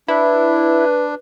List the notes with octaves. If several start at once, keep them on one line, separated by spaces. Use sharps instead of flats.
D4 E4 B4